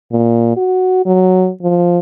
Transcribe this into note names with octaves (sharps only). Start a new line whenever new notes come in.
A#2
F#4
F#3
F3